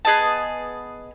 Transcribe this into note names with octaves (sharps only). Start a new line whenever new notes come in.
B3 G#4 D#5 A5